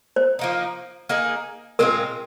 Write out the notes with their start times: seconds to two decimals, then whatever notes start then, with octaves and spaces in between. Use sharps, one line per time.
0.16 C5
0.39 F3 A#3 D#4
1.09 A#3 D#4 G#4
1.79 A#2 G#3 C4 F4 A#4